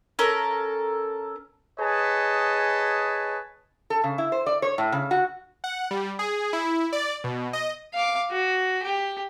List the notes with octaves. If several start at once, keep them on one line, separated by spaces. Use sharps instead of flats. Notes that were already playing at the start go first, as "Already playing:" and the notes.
C#4 A4 A#4
G#4 B4 C#5 D#5 A5
A4
C#3
E4
C5
D5
C#5
A2
C#3
F#4
F#5
G3
G#4
E4
D5
B2
D#5
F5 D6
F#4
G4